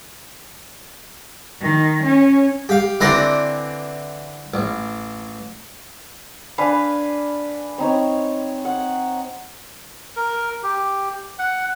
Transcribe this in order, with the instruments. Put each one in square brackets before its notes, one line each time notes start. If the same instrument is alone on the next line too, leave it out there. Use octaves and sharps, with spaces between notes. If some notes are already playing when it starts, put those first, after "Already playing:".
[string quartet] D#3
C#4
[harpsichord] G4 F5
D3 E3 C4 D5 A#5 C6
A1
[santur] D4 B4 F5 G#5
C4 D#4 C#5
F#5
[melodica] A#4
G4
F#5